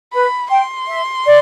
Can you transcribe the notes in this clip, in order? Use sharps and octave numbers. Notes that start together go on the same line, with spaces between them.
B4 B5
G5 C6
E5
D5